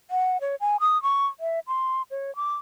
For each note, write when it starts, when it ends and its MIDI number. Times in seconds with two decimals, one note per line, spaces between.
0.11 0.40 78
0.41 0.55 73
0.61 0.77 80
0.80 1.01 87
1.03 1.26 85
1.40 1.60 76
1.68 2.02 84
2.11 2.34 73
2.36 2.56 86